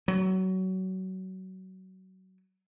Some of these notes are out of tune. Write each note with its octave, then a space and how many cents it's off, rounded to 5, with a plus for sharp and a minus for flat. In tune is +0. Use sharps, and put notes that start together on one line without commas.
F#3 +20